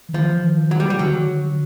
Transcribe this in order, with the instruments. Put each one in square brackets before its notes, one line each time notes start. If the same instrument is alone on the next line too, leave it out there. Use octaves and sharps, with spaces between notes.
[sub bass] E3
[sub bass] D#3 [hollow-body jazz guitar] F3
[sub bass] E3
D#3
[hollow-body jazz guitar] F#3
G3
G3
[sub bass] D3 [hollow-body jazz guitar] F#3
[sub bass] D#3
D3